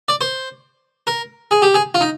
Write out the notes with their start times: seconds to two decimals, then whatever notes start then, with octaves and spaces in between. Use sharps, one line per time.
0.08 D5
0.21 C5
1.07 A#4
1.51 G#4
1.62 G4
1.74 G#4
1.94 F4
2.01 D#4